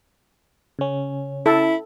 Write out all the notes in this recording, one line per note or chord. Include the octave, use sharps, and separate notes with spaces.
C#3 C#4
E4 A4